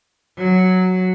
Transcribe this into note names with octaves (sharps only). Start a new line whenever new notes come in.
F#3